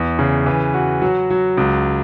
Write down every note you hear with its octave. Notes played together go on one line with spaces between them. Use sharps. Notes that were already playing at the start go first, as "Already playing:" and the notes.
Already playing: E2
C#3
E3
F#4
F#3
F#3
C#2